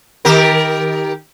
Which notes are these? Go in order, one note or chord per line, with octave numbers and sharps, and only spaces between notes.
D#3 G4 A#4